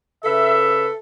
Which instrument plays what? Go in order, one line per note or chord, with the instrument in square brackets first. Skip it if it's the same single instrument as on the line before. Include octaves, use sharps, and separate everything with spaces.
[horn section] C#3 B4 E5 [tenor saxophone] A4